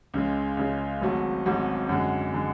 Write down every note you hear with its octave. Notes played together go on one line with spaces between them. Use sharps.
C#2 C#3 G#3
C#2 C#3 G#3
G#1 G#2 F#3 A3
G#1 G#2 F#3 A3
F#2 D3 G#3
D3 G#3